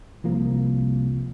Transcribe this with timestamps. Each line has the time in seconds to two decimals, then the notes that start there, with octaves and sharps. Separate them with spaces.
0.24 C2 F3 A#3